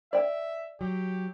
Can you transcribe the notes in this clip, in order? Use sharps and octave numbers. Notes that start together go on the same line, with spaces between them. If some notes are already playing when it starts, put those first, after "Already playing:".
D5 E5 G5
F#3 G4